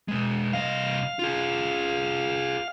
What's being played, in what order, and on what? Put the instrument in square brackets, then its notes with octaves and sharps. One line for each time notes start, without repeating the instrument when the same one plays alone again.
[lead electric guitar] B2 G#3
[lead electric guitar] C2 D#5 [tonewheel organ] F5
[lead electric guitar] F4 G#4